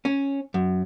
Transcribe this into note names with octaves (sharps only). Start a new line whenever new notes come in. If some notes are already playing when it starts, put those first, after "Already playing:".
C#4
F#2